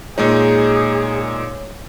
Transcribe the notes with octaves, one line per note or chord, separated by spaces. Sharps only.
A#2 G#3 D#4 G#4 C#5